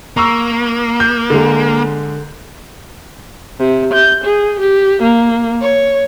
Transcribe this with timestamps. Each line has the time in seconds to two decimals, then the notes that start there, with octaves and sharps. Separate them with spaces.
0.17 A#3 A#5 C#6 E6
1.00 G6
1.30 D3 G#3
3.59 C3
3.93 G6
4.23 G#4
4.59 G4
5.01 A#3
5.61 C#5